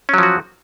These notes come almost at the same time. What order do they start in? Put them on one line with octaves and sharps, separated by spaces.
C#4 F#3 F3 F#4